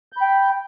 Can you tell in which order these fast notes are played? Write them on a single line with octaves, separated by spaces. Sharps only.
G6 B5 G5